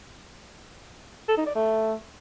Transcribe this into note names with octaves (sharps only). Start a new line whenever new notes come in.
A4
D#4
D5
A3